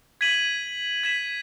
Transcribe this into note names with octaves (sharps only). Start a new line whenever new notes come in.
G#6 B6 D#7 F#7
G#6 B6 E7